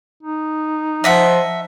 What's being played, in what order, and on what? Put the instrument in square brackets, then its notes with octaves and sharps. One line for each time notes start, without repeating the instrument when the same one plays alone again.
[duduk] D#4
[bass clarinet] F3 [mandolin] D#5 E5 F#5